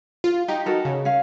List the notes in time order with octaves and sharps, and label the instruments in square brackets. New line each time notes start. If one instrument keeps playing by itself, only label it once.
[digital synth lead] F4
[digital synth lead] D#4 [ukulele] G4
[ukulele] F#4 A4 A#4
[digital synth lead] C#3
[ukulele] C#4 F5